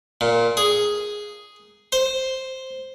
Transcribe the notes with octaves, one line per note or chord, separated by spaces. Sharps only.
A#2
G#4
C5